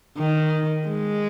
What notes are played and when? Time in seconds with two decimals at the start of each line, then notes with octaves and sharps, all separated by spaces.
0.18 D#3
0.88 G#3